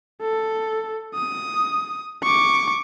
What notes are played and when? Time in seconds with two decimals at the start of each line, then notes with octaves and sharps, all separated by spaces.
0.22 A4
1.15 D#6
2.23 C#6 D6